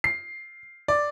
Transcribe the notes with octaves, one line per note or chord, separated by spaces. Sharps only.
C7
D5